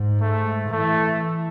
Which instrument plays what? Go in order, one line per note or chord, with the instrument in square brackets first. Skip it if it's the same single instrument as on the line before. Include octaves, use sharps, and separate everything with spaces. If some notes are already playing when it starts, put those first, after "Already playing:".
Already playing: [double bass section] G#2
[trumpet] A3
[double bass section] E3 [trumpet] A3